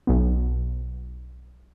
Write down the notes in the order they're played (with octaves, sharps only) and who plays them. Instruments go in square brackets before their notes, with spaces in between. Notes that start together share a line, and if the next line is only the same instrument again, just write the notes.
[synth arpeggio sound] B1 B3